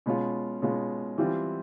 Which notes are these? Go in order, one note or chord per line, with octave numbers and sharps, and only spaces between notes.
B2 G#3 C#4 F4
B2 G#3 C#4 F4
E3 G3 C4 F4